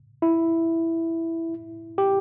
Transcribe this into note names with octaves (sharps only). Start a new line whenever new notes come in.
E4
G4